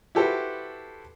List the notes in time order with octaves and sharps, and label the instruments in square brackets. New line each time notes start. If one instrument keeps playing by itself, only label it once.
[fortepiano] E4 F#4 G4 A4 B4 C5